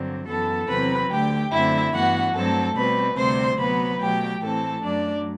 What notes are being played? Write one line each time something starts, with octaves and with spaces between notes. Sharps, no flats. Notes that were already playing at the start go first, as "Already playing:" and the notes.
Already playing: G2 D3 F#3 C4
F#2 E3 B3 A4 A5
E2 C3 F#3 C4 B4 B5
D2 D3 A3 G4 G5
F#2 D3 A3 C4 E4 E5
G2 E3 B3 F#4 F#5
G2 F#3 A3 C4 A4 A5
B2 G3 C4 B4 B5
D2 C3 G3 C4 C5 C6
C3 F#3 B3 B4 B5
B2 F#3 A3 G4 G5
A2 E3 A3 C4 A4 A5
F#2 F#3 A3 D4 D5